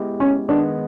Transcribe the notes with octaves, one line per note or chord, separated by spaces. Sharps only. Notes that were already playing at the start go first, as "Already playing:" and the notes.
Already playing: G#3 B3 E4 G4
C#4
D#3 G#3 B3 D4